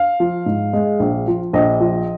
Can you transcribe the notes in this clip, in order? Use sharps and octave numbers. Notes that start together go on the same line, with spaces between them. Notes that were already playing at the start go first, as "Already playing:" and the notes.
Already playing: F5
F3
G#2
G#3
A#1
F3
A#1 D#5
F3